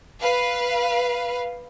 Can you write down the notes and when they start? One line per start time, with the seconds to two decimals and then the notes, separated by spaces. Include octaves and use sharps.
0.21 B4 F5